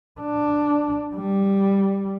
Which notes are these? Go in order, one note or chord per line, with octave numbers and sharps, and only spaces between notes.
D4
G3